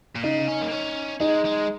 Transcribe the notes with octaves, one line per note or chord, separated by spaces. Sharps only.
A#2
C#3 D#4
C#4
A#3
C#4
G#3 D#4
G#3